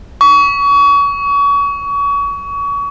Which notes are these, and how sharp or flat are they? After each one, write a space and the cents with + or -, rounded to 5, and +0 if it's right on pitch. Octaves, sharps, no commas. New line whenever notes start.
C#6 +35